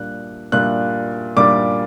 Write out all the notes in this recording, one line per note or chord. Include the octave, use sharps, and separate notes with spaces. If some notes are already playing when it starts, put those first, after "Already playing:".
Already playing: A#2 G3 D4 F#6
A#2 G3 D4 F#6
A#2 G3 D4 D6